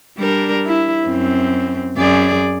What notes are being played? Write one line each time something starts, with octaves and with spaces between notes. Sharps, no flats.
G3 D4 A#4
E4
F#2 C4
F#2 G#4 D5